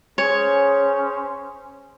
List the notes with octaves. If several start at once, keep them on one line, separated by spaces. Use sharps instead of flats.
C#4 G#4 C5 C#5